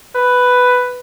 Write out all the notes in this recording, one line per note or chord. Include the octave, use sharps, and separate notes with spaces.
B4